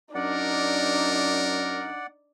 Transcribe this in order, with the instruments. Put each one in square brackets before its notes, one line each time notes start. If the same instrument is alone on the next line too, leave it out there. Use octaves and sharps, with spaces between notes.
[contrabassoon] F#2 [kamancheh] D4 D#4 [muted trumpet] A#4 [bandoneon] D5 F#5